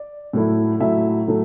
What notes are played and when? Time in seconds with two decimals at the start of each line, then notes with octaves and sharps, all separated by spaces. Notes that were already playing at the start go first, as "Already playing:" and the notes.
Already playing: D5
0.33 A2 F#3 A3 E4
0.80 A2 F#3 A3 E4 E5
1.28 A2 F#3 A3